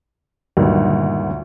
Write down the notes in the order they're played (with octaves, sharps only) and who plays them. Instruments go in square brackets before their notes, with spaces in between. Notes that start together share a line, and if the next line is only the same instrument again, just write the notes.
[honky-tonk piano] D2 F#3 [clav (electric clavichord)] G2 A#2 D#3